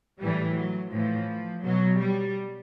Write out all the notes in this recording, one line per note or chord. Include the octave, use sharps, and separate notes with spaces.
A2 E3 G3
F#3
A2 E3 F3
B2 F#3
G3